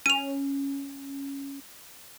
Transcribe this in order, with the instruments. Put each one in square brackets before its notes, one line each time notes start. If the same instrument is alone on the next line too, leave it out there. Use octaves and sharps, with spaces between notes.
[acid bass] C#4 [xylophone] D#7 F7